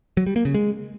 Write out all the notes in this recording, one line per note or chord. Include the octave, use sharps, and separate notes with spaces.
F#3
G3
A#3
C#3
G#3